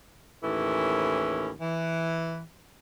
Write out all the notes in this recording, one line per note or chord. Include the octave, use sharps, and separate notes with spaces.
D#2 A2 E3 C#4
E3